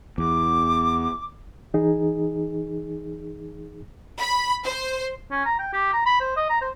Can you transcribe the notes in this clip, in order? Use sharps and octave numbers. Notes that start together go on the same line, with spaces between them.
E2 D6
E3 D#4 G#4
B5
C5
C#4
A#5
G5
G4
A#5
B5
C5
D#5
A#5
C5